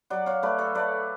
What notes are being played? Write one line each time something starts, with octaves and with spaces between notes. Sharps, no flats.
F#3 D5 F#5
C#5 F5
A3 B4 D5
A4 C#5
A3 B4 D5